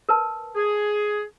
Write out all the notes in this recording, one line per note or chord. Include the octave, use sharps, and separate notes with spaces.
A#4 B4 A5
G#4